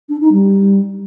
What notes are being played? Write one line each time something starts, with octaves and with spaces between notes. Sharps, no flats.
D4
D#4
G3